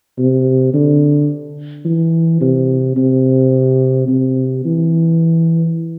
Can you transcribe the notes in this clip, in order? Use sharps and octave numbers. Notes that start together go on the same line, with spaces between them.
C3
D3
E3
C3
C3
C3
E3